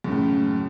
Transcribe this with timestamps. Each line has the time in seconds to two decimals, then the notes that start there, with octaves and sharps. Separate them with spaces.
0.04 F#2
0.08 C#3
0.12 A2